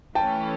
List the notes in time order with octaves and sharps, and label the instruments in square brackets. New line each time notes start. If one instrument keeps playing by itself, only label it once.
[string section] E3 A3 C#4 [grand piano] G5 A5